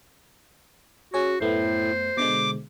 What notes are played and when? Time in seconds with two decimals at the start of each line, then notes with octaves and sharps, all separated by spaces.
1.14 C#4 F#4 G#4 C#5
1.40 F#2 A2 A3 B3 C5
2.17 B2 D3 G#3 D6